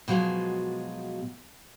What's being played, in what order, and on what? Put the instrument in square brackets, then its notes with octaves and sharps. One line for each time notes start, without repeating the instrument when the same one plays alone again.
[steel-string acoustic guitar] B2 F3 F#3 G#3